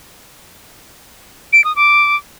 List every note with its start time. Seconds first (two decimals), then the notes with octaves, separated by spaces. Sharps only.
1.53 D7
1.64 D#6
1.76 D6